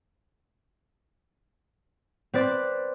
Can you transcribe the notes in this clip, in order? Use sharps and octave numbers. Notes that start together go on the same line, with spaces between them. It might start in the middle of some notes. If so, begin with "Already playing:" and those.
C4 B4 D5